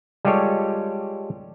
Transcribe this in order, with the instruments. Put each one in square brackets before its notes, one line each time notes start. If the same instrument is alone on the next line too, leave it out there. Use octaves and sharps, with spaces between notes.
[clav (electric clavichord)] G3 G#3 F4 G4 A4 C#5